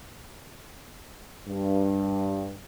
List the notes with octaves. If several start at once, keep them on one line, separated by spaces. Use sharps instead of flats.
G2